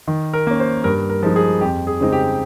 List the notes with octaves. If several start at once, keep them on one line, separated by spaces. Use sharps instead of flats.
D#3
A#4
A#3 C#4
C5
G2 A#4
A#4
F3 G#3 D#4
G#4
F2 G4
G#4
C#3 G#3 C4 D#4
G4